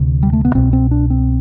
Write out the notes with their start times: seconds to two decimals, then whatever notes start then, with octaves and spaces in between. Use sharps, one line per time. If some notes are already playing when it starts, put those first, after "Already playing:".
Already playing: D2 C3
0.23 G3
0.33 A3
0.45 B3
0.55 C2 B2 C4
0.73 C4
0.91 D4
1.10 C4